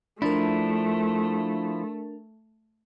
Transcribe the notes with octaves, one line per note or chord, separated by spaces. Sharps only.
F3 A3 D4 E4 A#4